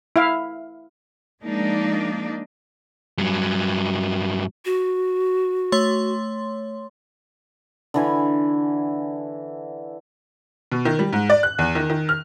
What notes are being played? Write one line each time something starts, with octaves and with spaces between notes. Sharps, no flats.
E4 E5 F5
F3 G#3 A#3 D4 D#4 D5
G2 F#3
F#4
A3 C#5 C6
D3 E3 G#5
B2
D#3
G3
G#2
D5
F#6
E2
D#3
D#3
F6